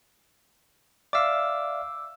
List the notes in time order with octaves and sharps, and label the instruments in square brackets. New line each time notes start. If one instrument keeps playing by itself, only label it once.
[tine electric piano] D5 E5 F5 [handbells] D6 E6